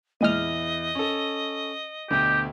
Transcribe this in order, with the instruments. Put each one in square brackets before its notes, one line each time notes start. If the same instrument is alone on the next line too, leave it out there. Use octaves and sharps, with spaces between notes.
[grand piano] E2 E4 D#7 [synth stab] A#2 G#3 F6 [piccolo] D#5
[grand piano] C#4 A4
[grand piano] D2 B2 G5 [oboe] G4